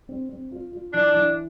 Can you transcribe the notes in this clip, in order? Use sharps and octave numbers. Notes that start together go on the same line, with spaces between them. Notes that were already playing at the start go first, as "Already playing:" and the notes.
C4
C4
F4
F4
E3 D4
E3